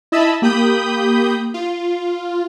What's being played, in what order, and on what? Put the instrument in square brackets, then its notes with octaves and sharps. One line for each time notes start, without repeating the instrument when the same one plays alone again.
[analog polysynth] E4 D#5 E5 A5 B5 E6
A#3 G4 B5 D#6 G6
F4